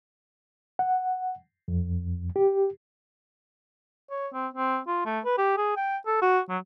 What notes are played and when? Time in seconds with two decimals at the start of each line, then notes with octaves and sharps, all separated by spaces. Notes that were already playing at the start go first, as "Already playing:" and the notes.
0.79 F#5
1.68 F2
2.36 G4
4.10 C#5
4.33 C4
4.54 C4
4.87 F4
5.05 A3
5.25 B4
5.38 G4
5.57 G#4
5.76 G5
6.06 A4
6.22 F#4
6.49 F#3